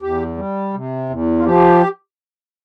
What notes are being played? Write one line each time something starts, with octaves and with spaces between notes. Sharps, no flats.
E2 G4
G3
C3
E2
F4
F3 G4